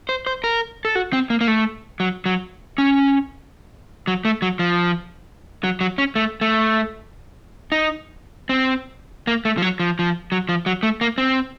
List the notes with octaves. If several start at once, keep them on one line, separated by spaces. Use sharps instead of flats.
C5
C5
A#4
A4
F#4
C4
A#3
A#3
A3
F#3
F#3
C#4
F#3
A3
F#3
F3
F#3
F#3
C#4
A3
A3
D#4
C4
A#3
A3
F3
F#3
F3
F3
F#3
F3
F#3
A3
A#3
C4